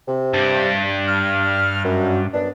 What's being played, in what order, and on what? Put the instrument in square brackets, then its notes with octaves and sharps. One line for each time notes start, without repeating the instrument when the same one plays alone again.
[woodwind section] C3
[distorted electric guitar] G2 D4
[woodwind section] F6
F#2
F#2 B3 D4